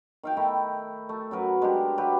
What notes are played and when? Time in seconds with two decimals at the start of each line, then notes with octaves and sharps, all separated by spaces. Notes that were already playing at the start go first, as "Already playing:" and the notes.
0.23 D#3 F5 G5
0.37 D#3 A3 E4 A#5
1.09 A3
1.31 F#2 F#3 A#4 B4
1.62 G#3 D4 G4
1.98 F#3 G4 B4